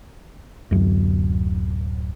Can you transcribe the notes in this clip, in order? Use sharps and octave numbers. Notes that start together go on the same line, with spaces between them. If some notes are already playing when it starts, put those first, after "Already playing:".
D1 F#2